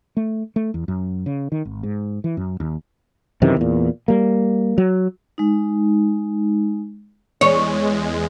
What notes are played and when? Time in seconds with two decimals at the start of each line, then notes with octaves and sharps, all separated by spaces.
0.17 A3
0.56 A3
0.74 E2
0.88 F#2
1.26 C#3
1.52 D#3
1.65 G#1
1.83 G#2
2.24 E3
2.37 F#2
2.60 D#2
3.42 F#2 C3 D#3 E3
3.56 E2 A#2
4.08 G3 A#3
4.78 F#3
5.38 G#3 D#4
7.41 E2 G#3 C#5